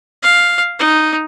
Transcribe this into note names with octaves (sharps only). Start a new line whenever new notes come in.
F5
D#4